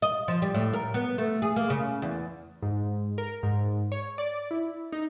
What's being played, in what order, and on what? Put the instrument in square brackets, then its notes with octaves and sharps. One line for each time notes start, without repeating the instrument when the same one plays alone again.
[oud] D#5
F3
G3
A2
A#4
B3
A3
G#4
A#3
C#3
E2
[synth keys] G#2
A#4
G#2
C#5
D5
E4
D#4